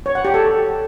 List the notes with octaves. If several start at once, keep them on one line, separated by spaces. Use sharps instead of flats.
C#5
F#5
G4
A4